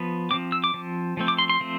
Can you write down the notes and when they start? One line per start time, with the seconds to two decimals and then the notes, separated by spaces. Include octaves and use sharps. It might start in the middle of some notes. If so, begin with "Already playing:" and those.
Already playing: F3 B3
0.31 F3 C4 D6
0.52 E6
0.64 D6
0.74 F3 C4
1.17 F3 A3 C4
1.28 D6
1.38 C6
1.49 C6
1.60 F3 A3 C4